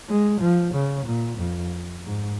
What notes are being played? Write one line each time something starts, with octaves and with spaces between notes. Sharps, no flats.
G#3
F3
C#3
A#2
F2
G#2